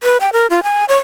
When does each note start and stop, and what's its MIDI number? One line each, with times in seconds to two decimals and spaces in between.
0.03 0.17 71
0.21 0.30 79
0.33 0.47 70
0.50 0.63 65
0.63 0.85 80
0.89 0.97 73